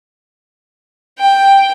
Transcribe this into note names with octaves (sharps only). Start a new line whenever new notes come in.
G5